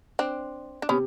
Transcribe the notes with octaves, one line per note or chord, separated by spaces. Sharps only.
C4 D4
D4
C3 B3 C#4